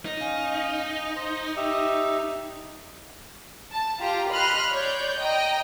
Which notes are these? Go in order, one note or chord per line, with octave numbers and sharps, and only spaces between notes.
D#4
C#4 F5
C5
G4 D#5 E5
A5
F4 G4 A#5
D#5 B5 C6 F6 F#6
C#5 D5 G6
D#5 G5 A#5